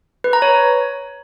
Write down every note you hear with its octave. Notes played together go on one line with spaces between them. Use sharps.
B4
A#5
C#5